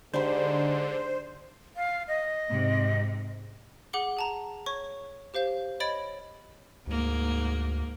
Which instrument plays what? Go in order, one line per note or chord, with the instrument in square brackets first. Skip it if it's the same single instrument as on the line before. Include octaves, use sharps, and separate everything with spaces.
[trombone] G#2 [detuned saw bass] D3 [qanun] D4 G4 B4 [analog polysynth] C5
[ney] F5
D#5
[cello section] G#2 C3
[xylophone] G#4 F#5 D6 G7
G#4 A5 A#5
C#5 C#6
G4 C5 F5 G6
C#5 D#5 B5 A6 D7
[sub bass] D2 [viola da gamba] G#2 A#3